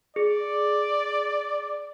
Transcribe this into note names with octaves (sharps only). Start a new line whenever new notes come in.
G#4 D5